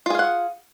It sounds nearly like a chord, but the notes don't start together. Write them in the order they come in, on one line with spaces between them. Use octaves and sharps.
F4 G#4 F5 F#5